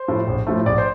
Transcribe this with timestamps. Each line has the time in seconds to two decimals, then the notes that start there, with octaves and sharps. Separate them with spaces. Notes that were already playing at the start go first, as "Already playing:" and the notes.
Already playing: C5
0.08 A2 F3 A3
0.27 A#1
0.47 A2 F3 A3
0.66 A#1 D5
0.78 C5